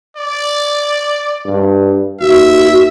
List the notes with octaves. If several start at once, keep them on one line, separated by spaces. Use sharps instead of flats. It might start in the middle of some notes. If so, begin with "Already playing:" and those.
D5
G2
D#2 F#4 E5